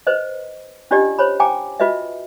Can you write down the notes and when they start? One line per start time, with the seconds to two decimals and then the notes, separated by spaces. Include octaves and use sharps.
0.07 B4 C5 D#5
0.91 C#4 D4 F4 G4 D5 D#5
1.19 C5 C#5 B5
1.40 G5 G#5 A#5 D6
1.80 F4 F#4 B4 D#5 E5